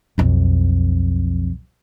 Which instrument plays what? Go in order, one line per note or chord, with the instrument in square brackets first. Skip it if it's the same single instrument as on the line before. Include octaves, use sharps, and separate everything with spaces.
[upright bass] B1 F2